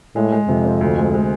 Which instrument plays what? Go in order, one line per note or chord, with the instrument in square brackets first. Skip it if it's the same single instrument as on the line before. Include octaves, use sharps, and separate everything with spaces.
[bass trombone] A2 [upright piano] G#3
[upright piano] G#3
[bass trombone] F2 [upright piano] C3
[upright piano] C4
D2
G#3
G#3